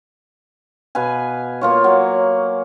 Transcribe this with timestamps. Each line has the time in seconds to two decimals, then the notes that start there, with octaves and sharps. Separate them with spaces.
0.95 B2 B4 F5 G#5
1.61 A#3 F4 C#5
1.84 F#3